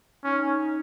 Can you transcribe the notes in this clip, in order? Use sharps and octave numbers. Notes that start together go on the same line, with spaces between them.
C#4 D#4